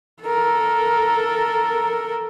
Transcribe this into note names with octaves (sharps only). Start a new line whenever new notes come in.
A4 A#4